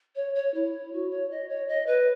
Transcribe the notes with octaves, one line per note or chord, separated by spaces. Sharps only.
C#5
C#5
E4
F#4
C#5
D#5
C#5
D#5
B4